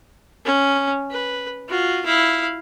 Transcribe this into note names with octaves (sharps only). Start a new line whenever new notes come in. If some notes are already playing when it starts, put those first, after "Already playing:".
C#4
B4
F4 F#4
E4 F5